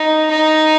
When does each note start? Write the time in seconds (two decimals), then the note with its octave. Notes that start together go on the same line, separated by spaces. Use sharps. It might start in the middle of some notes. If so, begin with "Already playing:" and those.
Already playing: D#4
0.31 D#4